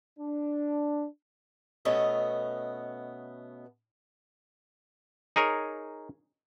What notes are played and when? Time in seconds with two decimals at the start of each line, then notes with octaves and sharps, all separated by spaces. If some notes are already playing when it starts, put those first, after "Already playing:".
0.19 D4
1.85 B2 A3 B3 C#4 D#5
5.36 D#4 G#4 A#4 C#5